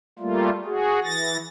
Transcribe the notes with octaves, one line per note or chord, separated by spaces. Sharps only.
G3 A3 A#3 F4
F#4 G#4
E3 A6 A#6